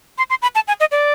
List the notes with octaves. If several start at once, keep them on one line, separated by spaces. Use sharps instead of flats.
C6
C6
B5
A5
G#5
D#5
D5